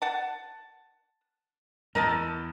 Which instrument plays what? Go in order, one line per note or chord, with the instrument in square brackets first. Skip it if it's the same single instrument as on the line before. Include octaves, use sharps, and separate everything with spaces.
[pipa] F#5 A5
[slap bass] E2 [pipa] A#4 D#5 A5